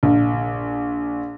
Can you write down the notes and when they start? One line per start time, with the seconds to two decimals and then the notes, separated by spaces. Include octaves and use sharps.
0.03 A#1